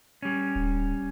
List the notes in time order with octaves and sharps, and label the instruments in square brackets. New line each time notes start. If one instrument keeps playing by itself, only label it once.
[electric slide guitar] G3 C#4
[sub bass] D1